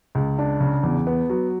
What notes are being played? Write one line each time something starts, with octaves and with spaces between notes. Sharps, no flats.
C#2
D4
C#3
E2
B3
F#3